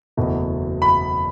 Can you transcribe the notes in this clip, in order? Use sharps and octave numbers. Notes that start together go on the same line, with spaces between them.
F#1 E2 B2 A3
B5